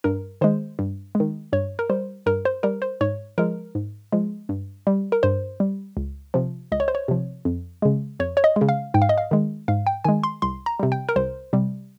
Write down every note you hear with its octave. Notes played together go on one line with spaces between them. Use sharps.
G2 A#4
D#3 G#3 C5
G2
G#3
D#3
G2 C#5
A#4
G3 C5
G2 A#4
C5
G3 A#4
C5
G#2 C#5
F3 G#3 A#4
G#2
F3 G#3
G2
G3
A#4
G2 C5
G3
C#2
C3 F3
C#2 D#5
C#5
C5
C#5
C3 F3
F2
C#3 G#3
F2 C#5
C#5
D#5
G#3
C#3
F5
G#2 G5
F5
D#5
F5
D#3 G#3
G#2 F5
G5
D#3 G#3 G#5
C6
C2 C6
A#5
C3 G3
G5
A#4
C2 C5
C3 G3